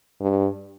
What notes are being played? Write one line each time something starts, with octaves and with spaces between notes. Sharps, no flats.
G2